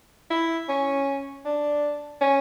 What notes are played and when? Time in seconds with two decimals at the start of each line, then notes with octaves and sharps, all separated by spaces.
0.30 E4
0.69 C#4
1.45 D4
2.21 C#4